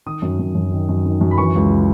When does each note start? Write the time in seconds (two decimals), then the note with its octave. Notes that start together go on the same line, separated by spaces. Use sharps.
0.06 D#3 D#6
0.22 F#2
0.39 F#2
0.55 F#2
0.72 D#3
0.89 F#2
1.06 D#3
1.21 F#2
1.31 B5
1.38 E3 C#6
1.55 C#2